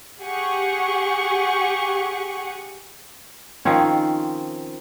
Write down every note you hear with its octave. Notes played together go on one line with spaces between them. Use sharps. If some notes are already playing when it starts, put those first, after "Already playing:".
G4 G#4 F#5 C#6
D#3 F3 C4 C#4